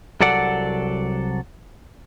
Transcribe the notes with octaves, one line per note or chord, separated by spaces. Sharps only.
C2 F#3 A4 D5 F#5